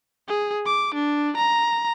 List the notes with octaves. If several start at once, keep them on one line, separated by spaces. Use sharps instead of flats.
G#4
D6
D4
A#5